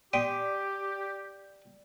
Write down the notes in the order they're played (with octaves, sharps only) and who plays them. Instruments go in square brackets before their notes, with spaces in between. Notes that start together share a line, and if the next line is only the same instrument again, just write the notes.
[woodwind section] G4 [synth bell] D5 [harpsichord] G5 C6 D#6